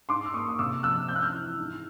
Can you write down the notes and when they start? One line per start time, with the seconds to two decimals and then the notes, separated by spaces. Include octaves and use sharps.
0.09 G#2 C6 D6
0.25 E6
0.34 A#3 C#6 D#6
0.49 D#6
0.59 C3 D6 E6
0.83 F3 E6 F#6
1.08 C4 G6
1.16 F#6
1.22 F6 G6
1.34 E3
1.58 G#2